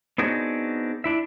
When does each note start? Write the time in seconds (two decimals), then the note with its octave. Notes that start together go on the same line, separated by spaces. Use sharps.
0.18 B3 C4 D4 D#4 F#4 G#4
1.04 D4 E4 E5